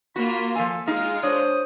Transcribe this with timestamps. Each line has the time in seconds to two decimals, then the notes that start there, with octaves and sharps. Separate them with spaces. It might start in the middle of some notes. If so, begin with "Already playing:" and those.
0.16 A#3 F4 F#4 B5
0.56 F3 A4 F5 G#5
0.88 G#3 D#4 F4 F5
1.23 D4 C5 C#5 D#6